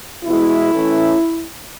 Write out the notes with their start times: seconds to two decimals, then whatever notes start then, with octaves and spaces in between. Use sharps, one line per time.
0.25 E2 B2 G#3 E4
0.70 A2 E3 A3 C#4